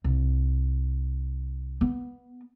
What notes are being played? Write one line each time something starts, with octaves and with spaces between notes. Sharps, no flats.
C2
B3